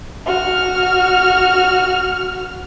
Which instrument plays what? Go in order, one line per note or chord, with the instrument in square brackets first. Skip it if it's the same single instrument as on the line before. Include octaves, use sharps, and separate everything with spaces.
[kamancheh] F#4 F6